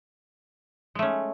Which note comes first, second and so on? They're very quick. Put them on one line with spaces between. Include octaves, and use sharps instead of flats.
G#3 A3 C#4